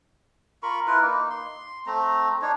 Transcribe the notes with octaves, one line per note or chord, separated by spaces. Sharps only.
F4 A#4 B5 C#6
E4 F4 A#4 B4
A#3 D#4
C6
A3 C4 A#5
D4 D#4 C#5